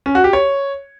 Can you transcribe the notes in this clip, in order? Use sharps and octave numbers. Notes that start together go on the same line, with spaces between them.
C#4
F#4
G4
C#5